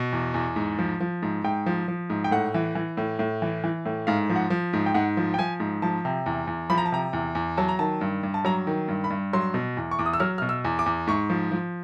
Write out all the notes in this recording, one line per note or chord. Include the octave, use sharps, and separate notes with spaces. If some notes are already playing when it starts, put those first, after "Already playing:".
Already playing: B2
E2
E2
G#2
F3
F3
G#2
G#2 G5
F3
F3
G#2
G5
A2 F#5
E3
E3
A2
A2
E3
E3
A2
G#2 F5
F3
F#5
F3
G#2
G5
G#2 F#5
F3
G5
F3 G#5
G#2
F3 A5
C3
E2
E2
F3 B5
A#5
A5
C3 A#5
E2
E2
F#3 A5
A#5
D#3 A5
G2
G2
A5
F#3 A#5
D#3
G2
B5
G2
F#3 C6
B2
E2
C#6
E2 D6
D#6
E6
F#3 F6
B2 F6
E6
E2
D6
E2
G#2 C#6
F3
F3